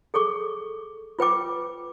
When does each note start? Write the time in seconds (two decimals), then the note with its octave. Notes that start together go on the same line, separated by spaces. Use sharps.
0.14 G#4 A4 C#6 D6
1.19 F4 B4 G5 D6